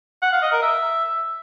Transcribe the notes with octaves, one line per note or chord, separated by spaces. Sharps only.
F#5
F5
D#5
A#4
E5